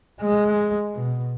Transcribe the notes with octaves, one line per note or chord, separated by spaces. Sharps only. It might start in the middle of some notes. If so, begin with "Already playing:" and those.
G#3
B2